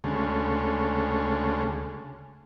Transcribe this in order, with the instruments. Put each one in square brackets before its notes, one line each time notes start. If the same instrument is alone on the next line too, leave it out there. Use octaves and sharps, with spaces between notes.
[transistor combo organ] D2 C#3 G#3 A3